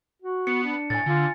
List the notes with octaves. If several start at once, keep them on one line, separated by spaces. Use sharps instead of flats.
F#4
B3 C#7
D4
A2 G#5 A6
D3 F4